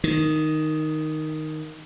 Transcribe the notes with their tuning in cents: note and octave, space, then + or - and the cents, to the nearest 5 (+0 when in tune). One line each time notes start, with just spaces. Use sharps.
D#3 -5